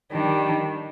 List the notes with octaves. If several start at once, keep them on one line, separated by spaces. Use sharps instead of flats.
D#3 G3 D4